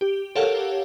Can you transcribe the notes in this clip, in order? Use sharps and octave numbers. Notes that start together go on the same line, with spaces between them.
G4
G4 A4 A#4 C#5 F5 F#5